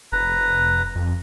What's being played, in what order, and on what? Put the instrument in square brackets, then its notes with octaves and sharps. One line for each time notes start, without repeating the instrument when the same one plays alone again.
[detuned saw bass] F1 [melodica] B4 A#5
[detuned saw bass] F2